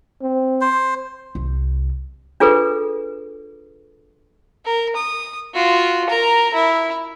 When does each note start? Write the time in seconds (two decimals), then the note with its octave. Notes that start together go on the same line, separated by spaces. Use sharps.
0.21 C4
0.61 C5
1.35 C2
2.40 D4 F4 G#4 A4 B4
4.65 A#4
4.96 D#6
5.54 F4 F#4
6.09 A#4 A#5
6.54 E4